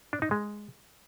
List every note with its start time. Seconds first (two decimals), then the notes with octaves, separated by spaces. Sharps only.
0.13 D4
0.22 D#4
0.31 G#3